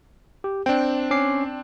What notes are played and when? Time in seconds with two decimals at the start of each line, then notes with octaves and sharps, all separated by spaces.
0.44 G4
0.66 C4 D4 G5
1.11 C#4 D6 C7